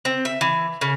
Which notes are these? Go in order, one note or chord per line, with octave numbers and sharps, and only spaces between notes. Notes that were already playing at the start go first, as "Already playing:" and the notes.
C4
E5
E3
C#3